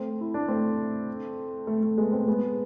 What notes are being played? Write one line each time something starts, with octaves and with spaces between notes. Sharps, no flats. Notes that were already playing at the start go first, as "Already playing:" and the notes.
Already playing: A3 C4
E4
D4
A3 C4
A3
A3
G#3 B3
A3 C4
G#3 B3